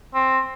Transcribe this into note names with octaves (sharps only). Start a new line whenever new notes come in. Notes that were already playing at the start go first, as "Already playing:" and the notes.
C4